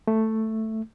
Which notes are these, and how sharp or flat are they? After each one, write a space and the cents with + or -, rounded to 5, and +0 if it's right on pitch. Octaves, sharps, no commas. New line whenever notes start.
A3 +5